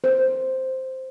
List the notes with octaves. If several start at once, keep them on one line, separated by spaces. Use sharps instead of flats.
C5